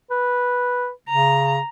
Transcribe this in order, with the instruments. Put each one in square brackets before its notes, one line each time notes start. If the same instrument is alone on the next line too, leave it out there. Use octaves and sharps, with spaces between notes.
[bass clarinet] B4
[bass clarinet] C#3 [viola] A#5